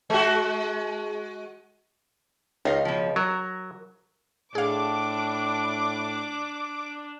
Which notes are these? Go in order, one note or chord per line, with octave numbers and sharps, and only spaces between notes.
G#3 F#4
C#2 D#4 F5
B2 F3
F#3 A#4
A2 D4 G#4 F5 D6